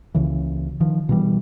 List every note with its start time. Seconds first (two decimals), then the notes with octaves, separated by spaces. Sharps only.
0.15 C#2 C#3 E3
0.80 D#3 F3
1.09 B2 E3 G3